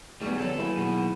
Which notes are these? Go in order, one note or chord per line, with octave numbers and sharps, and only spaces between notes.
F#3 G3 A3 B3 D#4 G#4 D5
F2 D3 F#3 A4
D#3 F#3 A#3 E4 G#4 B4
B2